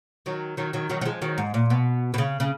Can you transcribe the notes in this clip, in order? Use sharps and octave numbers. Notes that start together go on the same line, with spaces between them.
D#3 F#3
D#3 F#3
D#3 F#3
D#3 F#3
F#3
F3 G#3
D#3 F#3
G#2
A#2
B2
B2
C#3
C#3